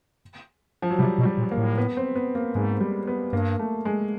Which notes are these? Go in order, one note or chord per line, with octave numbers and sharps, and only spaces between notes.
F3
F#3
C3 G3
B2
G3
A#2
A#3
A2
B3
C4
B3
A#3
G#2 G#3
G3
B3
G2 A#3
A3
G#3